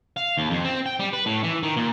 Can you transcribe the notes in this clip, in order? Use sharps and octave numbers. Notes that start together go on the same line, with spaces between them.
F5
D#2
F2
C4
G5
G3
B4
A2
E3
D#3
A#2